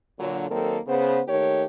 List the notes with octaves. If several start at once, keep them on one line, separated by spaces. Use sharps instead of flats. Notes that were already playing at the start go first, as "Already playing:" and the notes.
A#2 D3 F#3
D#3 F#3 A#3 C4 A4
C#3 B3 C5
D#2 D#3 A3 G4 C#5